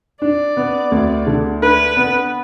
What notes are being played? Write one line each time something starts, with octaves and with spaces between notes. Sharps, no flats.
D4 D5
B3
D2
D3
D4 B4
B3